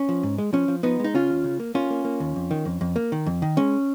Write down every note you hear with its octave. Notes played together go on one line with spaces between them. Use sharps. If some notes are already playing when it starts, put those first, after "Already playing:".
Already playing: C#4
F3
G#2
G#3
F3 C#4
F3
F3 B3 D#4
G#3 D#4
C#3 C#4 F4
D#2
C#3
A#3
A#3 C#4 F4
A#3
A#3
D#2
F2
D#3
F2
F2
A#3
D#3
F2
D#3
G#3 C#4